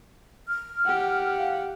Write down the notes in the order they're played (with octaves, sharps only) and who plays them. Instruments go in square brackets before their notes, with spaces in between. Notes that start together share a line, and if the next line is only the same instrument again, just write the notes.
[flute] F6
[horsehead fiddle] G4 F#5
[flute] F5